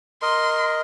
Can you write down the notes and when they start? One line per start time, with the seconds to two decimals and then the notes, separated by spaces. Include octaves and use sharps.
0.22 A#4 D#5 C6